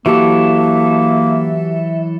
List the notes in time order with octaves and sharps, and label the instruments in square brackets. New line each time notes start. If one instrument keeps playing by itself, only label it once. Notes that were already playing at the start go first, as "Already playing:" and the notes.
[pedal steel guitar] E3 F#3 A4 [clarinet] A#3 [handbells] F#4 G4 [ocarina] E5